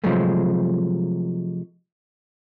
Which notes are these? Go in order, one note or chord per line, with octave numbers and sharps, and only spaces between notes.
C3 F3 F#3 G#3 A3